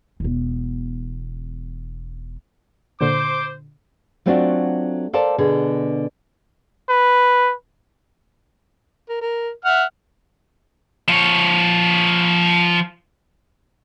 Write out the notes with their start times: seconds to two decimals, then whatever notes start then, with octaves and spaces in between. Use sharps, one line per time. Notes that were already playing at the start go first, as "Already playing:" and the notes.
0.20 E1 B3
3.01 A#2 D3 C5 D6
4.26 F#3 A3 C4 D4 F4 F#4
5.13 A4 A#4 C5 D5 F5 A5
5.38 B2 D3 G#4
6.89 B4
9.09 A#4
9.21 A#4
9.65 E5 F#5 F6
11.09 F3 C#5